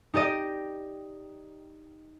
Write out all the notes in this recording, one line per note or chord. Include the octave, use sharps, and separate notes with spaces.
D#4 G4 D5 D#5